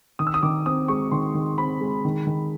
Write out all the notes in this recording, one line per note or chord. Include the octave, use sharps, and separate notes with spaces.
D#3 D#6
E6
D#6
D#3 D6
C4 D#6
G#3 C#6
D#3 C6
D#3
C4 B5
G#3
D#3
D#3